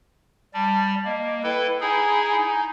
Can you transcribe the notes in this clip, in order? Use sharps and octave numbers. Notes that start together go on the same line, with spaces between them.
G3 D5 A5
A#3 D#5
E4 A4 B4 G5
D#4 E4 G#4 G#5
D#4